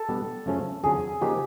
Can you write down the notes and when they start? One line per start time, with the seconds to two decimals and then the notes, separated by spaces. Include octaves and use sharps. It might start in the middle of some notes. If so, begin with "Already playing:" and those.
Already playing: A4
0.09 B2 G3 B3 D4
0.46 F#2 C#3 F3 A3 C#4
0.83 F2 D3 F#3 G#4
1.21 C#3 F3 A#3 D#4 F#4 G4